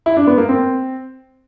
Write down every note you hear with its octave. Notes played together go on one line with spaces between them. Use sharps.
E4
D4
B3
A#3
C4